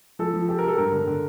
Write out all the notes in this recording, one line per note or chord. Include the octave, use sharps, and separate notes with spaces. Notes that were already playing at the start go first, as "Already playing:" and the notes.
F3 A4
F3
G4 A4
A#4
G4
A4
G2 A#4
D3
D3